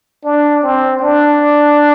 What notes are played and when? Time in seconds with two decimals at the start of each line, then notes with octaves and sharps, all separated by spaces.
0.25 D4
0.63 C4
1.02 D4